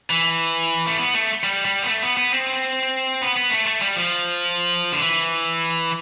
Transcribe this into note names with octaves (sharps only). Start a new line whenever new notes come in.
E3
A3
B3
A3
G3
G3
B3
A3
B3
B3
C4
B3
B3
A3
A3
G3
F3
D3
E3